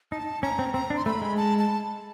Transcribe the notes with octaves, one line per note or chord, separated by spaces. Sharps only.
D#4 A5
C#4 A#5
C4
C4 A#5
D4
C6
A3 B5
G#3
A5
A5